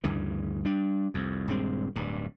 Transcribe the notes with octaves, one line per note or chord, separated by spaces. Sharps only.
D2 G2 C#3 E3
G3 D4
C2 F2
D#1 G2 G#3 C4
D1 G2